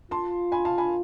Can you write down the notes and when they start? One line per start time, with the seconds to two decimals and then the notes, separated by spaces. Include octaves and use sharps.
0.11 F4 A5 C6
0.52 G#5 B5
0.65 F5 A5
0.78 G#5 B5